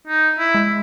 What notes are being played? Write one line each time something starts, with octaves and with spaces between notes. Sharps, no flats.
D#4
E4
G#3